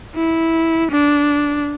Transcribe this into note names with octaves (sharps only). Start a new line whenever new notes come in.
E4
D4